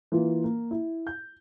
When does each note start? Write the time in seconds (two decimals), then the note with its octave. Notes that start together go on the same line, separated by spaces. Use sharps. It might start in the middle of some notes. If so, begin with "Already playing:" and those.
0.12 E3 A#3 F4
0.44 A#3
0.71 E4
1.07 G6